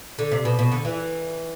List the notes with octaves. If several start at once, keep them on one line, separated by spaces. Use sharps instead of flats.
D3
C3
B2
B2
D3
E3